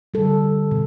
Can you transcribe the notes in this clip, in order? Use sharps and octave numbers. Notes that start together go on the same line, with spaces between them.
D3 G3 A4
B2